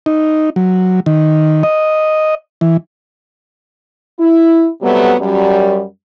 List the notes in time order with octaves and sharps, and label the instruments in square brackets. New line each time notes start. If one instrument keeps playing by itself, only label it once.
[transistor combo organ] D#4
F#3
D#3
D#5
E3
[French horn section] E4
C3 F#3 G3 A3 B3
F#2 G3